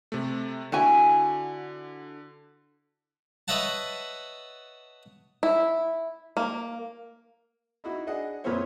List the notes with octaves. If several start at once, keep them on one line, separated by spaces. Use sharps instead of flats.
C3 A3
D3 E4 F#4 G#5
B4 C#5 D#5 E5 F#5 A5
E4
A#3
D#4 E4 F#4
D4 G#4 D#5 F#5
F2 A#2 B3 E4 C5 C#5